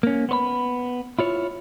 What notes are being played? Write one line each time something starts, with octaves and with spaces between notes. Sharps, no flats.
A#3 C#4
B3 C5 B5
E4 F4 C#5